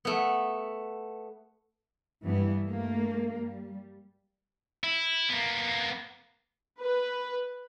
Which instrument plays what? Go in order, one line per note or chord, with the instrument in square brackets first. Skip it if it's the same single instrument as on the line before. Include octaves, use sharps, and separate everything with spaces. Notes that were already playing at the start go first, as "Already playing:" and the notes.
[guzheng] A3 B3
[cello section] G2 E3 G3 B3 E4
G2 A3 A#3
G3
[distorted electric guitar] E4
A#3 B3
[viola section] B4